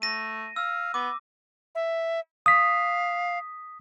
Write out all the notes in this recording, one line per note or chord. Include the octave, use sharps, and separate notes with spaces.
A3 A#6 D#7
F5 E6
B3 D6
E5
F5 D#6 B6